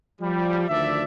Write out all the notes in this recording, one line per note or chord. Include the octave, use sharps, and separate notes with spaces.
F3 G3
D2 D#3 F3 D4 D5 E5